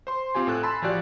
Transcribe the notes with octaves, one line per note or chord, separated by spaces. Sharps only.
C5 C6
C4 F4 G4 G#5
A2 A4 F#6
G#5 A5 B5 C6 E6 A6
A1 F3 F#4 G4 D5 F#6